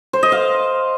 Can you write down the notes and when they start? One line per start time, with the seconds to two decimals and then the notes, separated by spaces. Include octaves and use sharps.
0.13 C5
0.23 D#5
0.32 F5